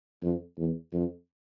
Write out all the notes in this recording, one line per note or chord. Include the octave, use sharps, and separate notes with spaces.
F2
E2
F2